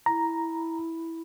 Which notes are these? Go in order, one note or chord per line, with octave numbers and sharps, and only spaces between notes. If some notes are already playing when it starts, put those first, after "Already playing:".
E4 A#5